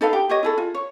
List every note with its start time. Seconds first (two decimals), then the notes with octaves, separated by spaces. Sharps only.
0.01 D#4 A4 B4 F5
0.13 G4
0.29 G4 C#5 D#5
0.43 E4 G#4 A4
0.58 F4
0.75 C#5